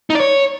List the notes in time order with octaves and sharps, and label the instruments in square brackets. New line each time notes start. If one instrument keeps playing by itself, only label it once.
[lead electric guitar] D#4
D5
C#5